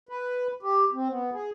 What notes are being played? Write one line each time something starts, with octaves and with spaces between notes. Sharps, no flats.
B4
G4
C4
B3
G#4